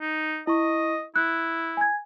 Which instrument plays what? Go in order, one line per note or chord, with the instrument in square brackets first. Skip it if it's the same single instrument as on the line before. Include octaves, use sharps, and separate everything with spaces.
[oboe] D#4
[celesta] E4 C#6 [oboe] D#5
[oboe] E4 [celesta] F#6
[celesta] G#5 G#6